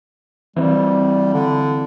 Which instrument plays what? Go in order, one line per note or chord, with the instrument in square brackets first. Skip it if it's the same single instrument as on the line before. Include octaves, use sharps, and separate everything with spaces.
[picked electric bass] E3 C4 [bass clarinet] G3
[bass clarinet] D3